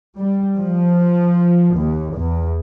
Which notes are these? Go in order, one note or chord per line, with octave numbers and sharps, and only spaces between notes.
G3
F3
D#2
E2